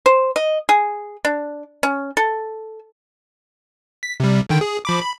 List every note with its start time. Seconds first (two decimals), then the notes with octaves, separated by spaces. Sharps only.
0.06 C5
0.36 D#5
0.69 G#4
1.25 D4
1.83 C#4
2.17 A4
4.03 B6
4.20 C3 G3
4.49 D3 D#3 G5
4.61 G#4
4.85 F3 B5 D6
5.01 B5